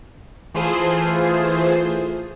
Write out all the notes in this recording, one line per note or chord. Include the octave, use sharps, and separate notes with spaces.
E3 A3 F4 G#4 C5